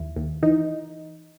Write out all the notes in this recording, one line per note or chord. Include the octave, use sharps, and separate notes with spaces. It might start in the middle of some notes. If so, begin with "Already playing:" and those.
Already playing: D#2 E4
D#2
E3 D#4